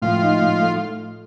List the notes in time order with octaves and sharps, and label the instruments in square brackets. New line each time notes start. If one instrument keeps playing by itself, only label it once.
[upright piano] A2 [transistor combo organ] F3 F4
[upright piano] D#4
A2
A3